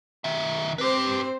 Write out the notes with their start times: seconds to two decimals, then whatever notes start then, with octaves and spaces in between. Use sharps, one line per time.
0.24 D#3 E5
0.78 C4 G4 B4 C5